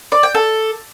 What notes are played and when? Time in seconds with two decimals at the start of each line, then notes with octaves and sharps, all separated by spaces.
0.12 D5
0.23 G5
0.35 A4